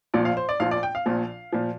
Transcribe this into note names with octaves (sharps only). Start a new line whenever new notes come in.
A#1 A#2 F3 D5
F5
C5
D5
A#1 A#2 F3 F5
D5
G5
F5
A#1 A#2 F3
A#2 F3